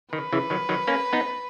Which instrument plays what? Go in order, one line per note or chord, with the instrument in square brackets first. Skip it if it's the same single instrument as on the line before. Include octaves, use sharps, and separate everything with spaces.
[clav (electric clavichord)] D#3 [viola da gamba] B4
[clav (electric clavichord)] C#3 E3
D#3 F#3
D#3 F#3
A#3 C#4
B3 D#4